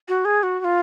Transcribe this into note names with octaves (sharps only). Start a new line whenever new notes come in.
F#4
G#4
F#4
F#4
F4